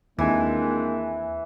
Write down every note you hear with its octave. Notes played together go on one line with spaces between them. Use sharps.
D#2 E3 G#3 A#3 C4 D4 G#5